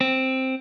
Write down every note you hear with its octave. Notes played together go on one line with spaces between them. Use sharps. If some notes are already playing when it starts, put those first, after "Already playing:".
C4